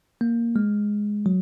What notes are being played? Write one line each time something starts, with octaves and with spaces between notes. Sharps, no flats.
A#3
G#3
F#3